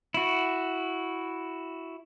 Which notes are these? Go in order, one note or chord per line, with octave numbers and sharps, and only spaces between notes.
E4 F#4